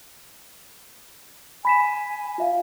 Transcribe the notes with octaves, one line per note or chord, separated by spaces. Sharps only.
G#5 B5 B6 E7
F4 E5 F5